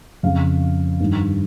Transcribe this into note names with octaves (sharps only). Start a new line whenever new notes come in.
F2 C#3 F5
G2 D#3